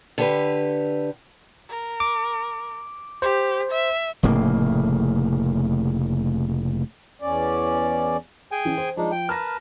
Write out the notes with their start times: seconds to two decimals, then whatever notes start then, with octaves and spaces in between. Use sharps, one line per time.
0.18 D3 G4 B4
1.69 A#4
2.00 D6
3.22 G4 C5
3.71 E5
4.23 F1 A2 C#3 A#3
7.22 E2 C#4 D5
8.51 G#4 G5 G#5
8.65 E3 C#4
8.77 C5
8.97 F3 G#3 D4 D#4
9.12 G5
9.29 A#4 B4 A5 F6 A#6